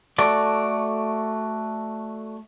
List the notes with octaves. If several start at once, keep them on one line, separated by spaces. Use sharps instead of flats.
A3 F#4 A4 D5